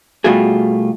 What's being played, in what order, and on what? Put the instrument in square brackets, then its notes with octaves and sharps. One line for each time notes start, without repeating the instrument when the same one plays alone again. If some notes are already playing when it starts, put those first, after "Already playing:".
[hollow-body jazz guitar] B2 G3 A3 F4 F#4 G#4